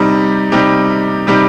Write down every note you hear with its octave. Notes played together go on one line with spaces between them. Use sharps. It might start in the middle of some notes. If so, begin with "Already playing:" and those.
Already playing: C3 G3 D#4 G4
C3 G3 D#4 G4
C3 G3 D#4 G4